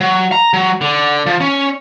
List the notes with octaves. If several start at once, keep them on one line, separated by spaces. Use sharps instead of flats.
F#3
A#5
F#3
D3
F3
C#4